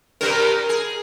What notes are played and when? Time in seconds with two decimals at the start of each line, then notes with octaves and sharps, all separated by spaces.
0.21 G2 C3 G3 A#4
0.69 G#4